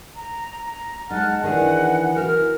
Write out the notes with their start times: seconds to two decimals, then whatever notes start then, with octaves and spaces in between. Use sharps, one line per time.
0.15 A#5
0.66 A#5
1.11 G#3 D#4 F#5 A5 F6
1.44 D#3 E3 D4 G#4 F#5
2.16 E4 F#4 A#4 F6